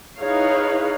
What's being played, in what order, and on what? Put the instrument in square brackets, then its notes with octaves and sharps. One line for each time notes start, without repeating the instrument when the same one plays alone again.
[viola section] D#4 E4 G#4 B4 C#5 F5